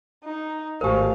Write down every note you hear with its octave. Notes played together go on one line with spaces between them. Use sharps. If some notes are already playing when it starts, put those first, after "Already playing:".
D#4
G#1 A3 G4 A#4 C5 F5 G#5 A5